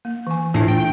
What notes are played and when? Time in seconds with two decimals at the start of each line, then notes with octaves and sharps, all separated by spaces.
0.05 A#3
0.27 E3 G#5
0.54 A2 D4 F4
0.68 G5